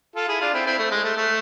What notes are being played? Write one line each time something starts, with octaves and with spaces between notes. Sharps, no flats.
F4 A4
E4 G#4
D4 F4
C4 E4
C4 E4
A3
G#3
A3
A3